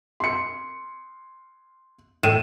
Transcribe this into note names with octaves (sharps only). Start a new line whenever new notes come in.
C6 C#7
A2 D#7 E7